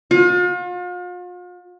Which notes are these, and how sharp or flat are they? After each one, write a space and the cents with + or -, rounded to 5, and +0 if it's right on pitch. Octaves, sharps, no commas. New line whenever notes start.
F4 +40